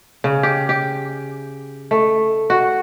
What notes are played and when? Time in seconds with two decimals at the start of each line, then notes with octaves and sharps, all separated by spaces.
0.24 C#3
0.43 G4
0.69 G4
1.91 A3
2.50 F#4